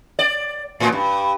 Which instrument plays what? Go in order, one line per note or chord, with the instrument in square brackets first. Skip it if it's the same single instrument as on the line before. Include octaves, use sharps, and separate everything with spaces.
[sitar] D5
A2
G2